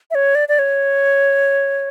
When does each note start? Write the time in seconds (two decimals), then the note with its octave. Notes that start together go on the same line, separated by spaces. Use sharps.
0.11 E5
0.15 C#5
0.35 D5
0.49 D5
0.59 C#5